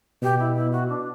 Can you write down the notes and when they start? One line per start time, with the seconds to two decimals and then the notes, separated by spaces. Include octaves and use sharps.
0.22 B2 G4
0.39 E4
0.56 E4
0.72 F#4
0.89 D4